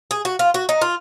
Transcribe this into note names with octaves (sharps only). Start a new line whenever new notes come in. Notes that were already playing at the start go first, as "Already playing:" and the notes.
G#4
F#4
F4
F#4
D#4
F4